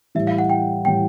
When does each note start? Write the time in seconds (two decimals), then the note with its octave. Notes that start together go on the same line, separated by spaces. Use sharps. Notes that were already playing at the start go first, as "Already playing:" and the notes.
0.15 A2 E3 G3 E5
0.27 F5
0.38 F#5
0.50 G5
0.85 A2 E3 G3 G5